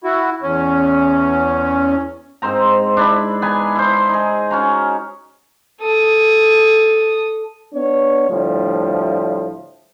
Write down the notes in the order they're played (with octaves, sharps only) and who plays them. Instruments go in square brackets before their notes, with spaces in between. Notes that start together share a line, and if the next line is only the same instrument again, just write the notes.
[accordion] E4 F#4
E2 C#4
[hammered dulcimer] G#2 C4 C5 A#5
D4 E4 B5
B3 G#5 A#5
E4 C5
D#4 G#4
C#4 F#4 A#5
[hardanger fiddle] A4 D#6
[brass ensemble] B3 D4 C#5
D2 A2 F3 G3